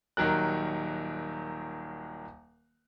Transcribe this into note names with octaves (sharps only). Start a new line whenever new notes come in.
D#1 D#3 F#3 A#4 F#6